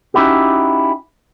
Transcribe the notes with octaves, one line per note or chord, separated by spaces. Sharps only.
C#4 D#4 E4 F#4 G4